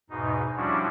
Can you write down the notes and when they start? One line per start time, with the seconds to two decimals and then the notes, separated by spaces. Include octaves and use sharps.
0.10 E2 G#2 B2 D#4
0.57 F3 G3 C#4 D4 E4 F#4